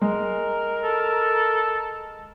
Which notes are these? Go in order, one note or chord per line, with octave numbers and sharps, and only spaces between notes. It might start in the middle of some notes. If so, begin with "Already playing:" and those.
G#3 A#4
A4